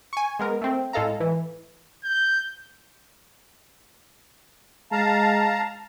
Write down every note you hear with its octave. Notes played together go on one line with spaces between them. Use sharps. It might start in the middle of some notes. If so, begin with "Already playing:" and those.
G#5 C#6
G#3 B3 A#4
A3 C4
A2 G#3 A4 F5 A#5
E3
G6
G#3 F5 A5 A#5